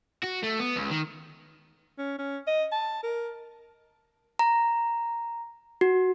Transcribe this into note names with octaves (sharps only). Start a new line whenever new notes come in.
F#4
A3
B3
C#2
D#3
C#4
C#4
D#5
A5
A#4
A#5
F#4